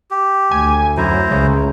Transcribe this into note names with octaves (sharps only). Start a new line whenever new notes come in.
G4
D2 G#5
F#2 E4 C5 A#5
C#2 C#3